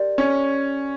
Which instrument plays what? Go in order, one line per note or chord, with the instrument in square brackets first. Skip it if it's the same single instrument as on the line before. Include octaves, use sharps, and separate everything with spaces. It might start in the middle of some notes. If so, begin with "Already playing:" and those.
Already playing: [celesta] G4 A#4 D5
[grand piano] C#4